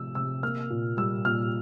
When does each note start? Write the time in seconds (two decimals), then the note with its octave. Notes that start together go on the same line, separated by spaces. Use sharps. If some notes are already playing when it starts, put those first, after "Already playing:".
Already playing: C3 F3 A3 E6
0.15 C3 E6
0.43 A#3 F6
0.70 A#2
0.97 G3 E6
1.25 A#2 F6